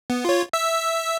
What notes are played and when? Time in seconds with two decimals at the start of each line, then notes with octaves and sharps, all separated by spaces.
0.10 B3
0.25 F4 C#5
0.53 E5 E6